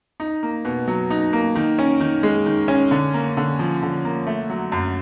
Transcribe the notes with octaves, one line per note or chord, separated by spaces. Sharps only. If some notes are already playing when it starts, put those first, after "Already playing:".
D#4
A#3
B2
F#3
D#4
A#3
D#3
C#4
D#3
G#3
D#3
C#4
D3
A#3
D3
F3
D3
A#3
A3
F#3
F#2